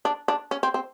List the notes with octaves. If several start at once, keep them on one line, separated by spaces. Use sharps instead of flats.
D4
D4
C#4
C4
C4